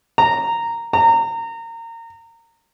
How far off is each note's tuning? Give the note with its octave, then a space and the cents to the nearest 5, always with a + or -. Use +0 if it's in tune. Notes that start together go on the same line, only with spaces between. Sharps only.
A#5 -10
A#5 -25